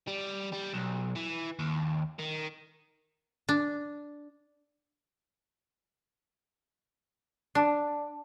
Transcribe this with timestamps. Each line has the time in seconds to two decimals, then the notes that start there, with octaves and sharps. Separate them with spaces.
0.07 G3
0.53 G3
0.74 B1
1.15 E3
1.59 D#2
2.19 D#3
3.49 D4
7.55 D4